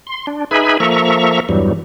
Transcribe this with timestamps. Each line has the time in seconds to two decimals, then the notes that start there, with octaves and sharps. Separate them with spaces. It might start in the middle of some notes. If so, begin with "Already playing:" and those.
0.07 C6
0.27 D4
0.51 D#4 G#4 B4 E5 G#5 B5
0.80 F3 A#3 A4 E5 A#5 C#6
1.49 E2 G2 E3 F#3 G3